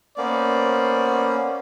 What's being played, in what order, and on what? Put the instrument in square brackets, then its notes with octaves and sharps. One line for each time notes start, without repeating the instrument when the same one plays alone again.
[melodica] A#3 B3 C#4 [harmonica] C5 D5